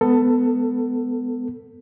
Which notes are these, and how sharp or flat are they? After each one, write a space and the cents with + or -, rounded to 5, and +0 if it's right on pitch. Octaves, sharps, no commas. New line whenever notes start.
G#3 +5 B3 +10 A4 +20